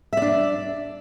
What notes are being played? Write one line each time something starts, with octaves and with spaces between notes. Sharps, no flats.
D4 D5 E5